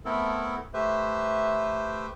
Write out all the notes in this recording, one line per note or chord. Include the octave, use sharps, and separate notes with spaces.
A3 B3 C4 E4 A4 A#4
A3 G4 B4 C5 E5